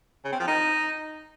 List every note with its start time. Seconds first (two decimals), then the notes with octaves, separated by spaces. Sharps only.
0.25 C#3
0.32 C4
0.40 F3
0.47 D#4